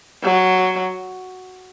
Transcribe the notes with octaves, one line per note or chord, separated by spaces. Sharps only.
F#3